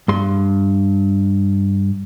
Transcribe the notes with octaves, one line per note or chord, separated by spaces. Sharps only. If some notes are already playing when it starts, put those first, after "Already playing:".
G2 C6